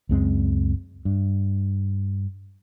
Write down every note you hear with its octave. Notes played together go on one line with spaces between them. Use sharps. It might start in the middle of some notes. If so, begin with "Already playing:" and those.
C#2 F#2 G#3 C4
G2